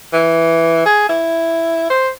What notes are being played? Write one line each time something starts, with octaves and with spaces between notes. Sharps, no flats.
E3
G#4
E4
C5